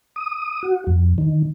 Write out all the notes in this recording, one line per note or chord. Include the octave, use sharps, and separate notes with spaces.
D#6
F#4
F2
D#3